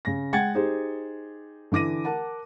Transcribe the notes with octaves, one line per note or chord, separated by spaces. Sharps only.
C#3 A#6
G#3 F#5 G5 G#6 A6 C#7
D#4 G4 G#4 C5
D3 E3 D6 A#6 D#7
A#4 F#5 A5